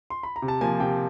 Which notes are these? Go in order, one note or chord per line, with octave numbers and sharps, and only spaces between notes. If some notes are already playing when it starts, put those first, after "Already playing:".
C6
B5
A#5
C3
A5
F3 A#3 G#5
C3 G5